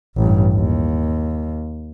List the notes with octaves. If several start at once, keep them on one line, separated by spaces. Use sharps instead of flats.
A1 G2
D#2